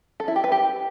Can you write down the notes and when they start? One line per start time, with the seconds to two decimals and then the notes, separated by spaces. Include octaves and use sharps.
0.20 A4
0.28 E4
0.36 G4
0.44 B4
0.52 G4